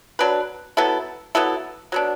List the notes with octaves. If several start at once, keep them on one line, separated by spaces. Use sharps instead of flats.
F#3 D4 B4
F#3 B3 E4 A4
F#3 B3 E4 A4
F#3 B3 D4